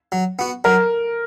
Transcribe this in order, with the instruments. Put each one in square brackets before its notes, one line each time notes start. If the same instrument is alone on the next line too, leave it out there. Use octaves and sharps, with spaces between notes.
[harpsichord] F#3
B3 F#4
[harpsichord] F#3 [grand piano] A#4